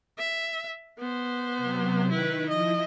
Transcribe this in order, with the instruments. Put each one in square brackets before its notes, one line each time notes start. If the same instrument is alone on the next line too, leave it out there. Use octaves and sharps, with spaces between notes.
[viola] E5
B3 C5
[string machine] C3 F#3
[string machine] D#3 D#4 [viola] E4 B4
[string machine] F3 E4 [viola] D#5